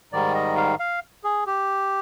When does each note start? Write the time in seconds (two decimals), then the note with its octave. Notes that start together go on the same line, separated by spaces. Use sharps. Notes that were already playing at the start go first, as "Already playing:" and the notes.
0.12 G#2 D#3 G3 D5
0.34 D#5
0.56 F5
0.79 F5
1.24 G#4
1.47 G4